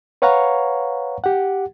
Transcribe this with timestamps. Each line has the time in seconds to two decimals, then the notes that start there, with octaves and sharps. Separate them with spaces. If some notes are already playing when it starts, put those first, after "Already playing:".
0.22 B4 C#5 F5 F#5 A#5 C#6
1.24 G4 F#5